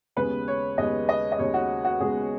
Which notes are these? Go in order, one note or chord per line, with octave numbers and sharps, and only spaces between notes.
D#2 C#3 G#3 B3 B4
C#5
D#2 C#3 G#3 B3 D#5
D#5
D#5
D#2 C#3 G#3 B3 C#5
F#4
F#4
D#2 C#3 G#3 B3 G#4